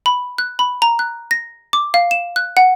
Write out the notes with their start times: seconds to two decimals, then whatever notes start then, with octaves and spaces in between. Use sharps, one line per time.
0.06 B5
0.38 F#6
0.59 B5
0.82 A#5
0.99 F#6
1.31 A#6
1.73 D6
1.94 F5
2.11 E7
2.36 F#6
2.57 F#5